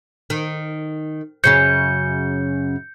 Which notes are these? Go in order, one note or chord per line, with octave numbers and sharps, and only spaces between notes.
D#3
F#2 C#3 C#4 G6 C#7